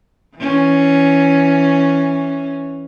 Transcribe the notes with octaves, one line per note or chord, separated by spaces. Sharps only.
E3 C#4